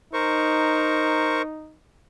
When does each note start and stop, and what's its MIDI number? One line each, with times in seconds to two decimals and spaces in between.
0.13 1.76 63
0.13 1.42 70
0.13 1.42 72
0.13 1.42 85